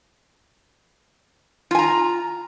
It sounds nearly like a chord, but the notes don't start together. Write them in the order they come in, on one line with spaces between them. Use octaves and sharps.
F4 G#5 A#5